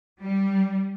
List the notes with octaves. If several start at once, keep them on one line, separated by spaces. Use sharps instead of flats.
G3